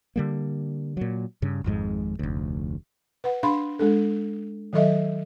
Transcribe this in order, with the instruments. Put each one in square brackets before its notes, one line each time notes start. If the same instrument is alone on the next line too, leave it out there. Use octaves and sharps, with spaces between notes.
[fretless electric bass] D3 G3 A#3
A#2 F#3
G2 C#3
G#1 F2 G#2 G#3
F1 D2
[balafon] B4 F#5
D4 F5 B5 C6
G#3 D4 A4
D#3 F#3 A4 D#5 E5